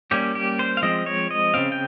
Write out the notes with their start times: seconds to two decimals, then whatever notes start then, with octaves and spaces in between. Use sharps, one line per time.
0.11 G3 A#3 C#4 G4
0.35 G4
0.59 C5
0.77 F5
0.82 F3 G#3 C4 D#5
1.06 C#5
1.31 D#5
1.54 C#3 F3 C4 F5
1.72 G5